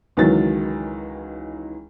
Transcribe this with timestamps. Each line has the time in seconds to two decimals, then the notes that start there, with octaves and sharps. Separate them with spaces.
0.17 C#2 D#3 E3 F#3 A6